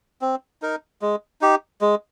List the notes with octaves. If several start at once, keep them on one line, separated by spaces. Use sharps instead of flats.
C4
D#4 A#4
G#3
D#4 G4
G#3